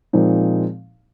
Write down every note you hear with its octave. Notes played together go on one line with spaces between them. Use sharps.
A#2 F3 G#3 C4 D#4